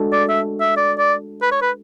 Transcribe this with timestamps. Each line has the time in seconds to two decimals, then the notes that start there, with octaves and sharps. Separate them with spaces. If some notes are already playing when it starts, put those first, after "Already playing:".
Already playing: G#3 D4 F#4 A4
0.13 D5
0.29 E5
0.61 E5
0.77 D5
0.99 D5
1.42 B4
1.52 C#5
1.62 B4